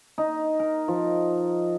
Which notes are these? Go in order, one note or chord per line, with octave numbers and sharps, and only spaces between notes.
D#4
A#4
F3